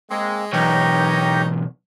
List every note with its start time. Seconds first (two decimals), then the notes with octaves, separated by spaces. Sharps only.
0.10 G#3 A#3 C4
0.53 B1 E2 D#4 G4 A#4 C#5 G5